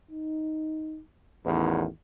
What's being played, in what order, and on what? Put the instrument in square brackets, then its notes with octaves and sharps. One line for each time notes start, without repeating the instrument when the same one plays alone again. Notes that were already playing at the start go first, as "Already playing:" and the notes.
[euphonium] D#4
[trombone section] A1 E2 [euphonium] D#3